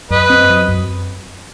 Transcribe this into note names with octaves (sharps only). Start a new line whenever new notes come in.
F#2 B4 D#5
C4
F#3
F#2